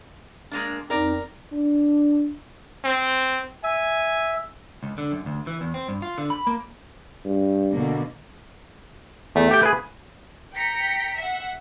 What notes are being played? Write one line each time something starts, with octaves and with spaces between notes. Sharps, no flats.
G#3 A#3 D4
F2 C4 D#4 A#4 D5
D4
C4
E5 G#5
C#2
D3
F#2
D2
E3
E2
C4
G2
F4
D3
B5
A#3
G2
B2 D3 A#3
E2 A3
G4 G5
G#4 B4
G5 A#5 B6 C#7
E5 F#5